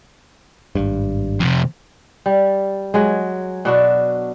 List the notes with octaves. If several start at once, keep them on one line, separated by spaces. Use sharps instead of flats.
G#1 G2
F2 C3
G3
F#3 G#3
B2 D4 F#4